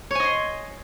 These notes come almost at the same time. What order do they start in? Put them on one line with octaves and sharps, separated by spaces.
C#5 G#5 D#5 C6